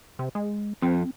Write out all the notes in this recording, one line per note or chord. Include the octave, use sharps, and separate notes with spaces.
C3
G#3
F2 C4